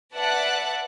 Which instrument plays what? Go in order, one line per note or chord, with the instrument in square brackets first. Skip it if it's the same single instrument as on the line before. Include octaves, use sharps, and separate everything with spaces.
[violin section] B4 D5 E5 F#5 A5 F#6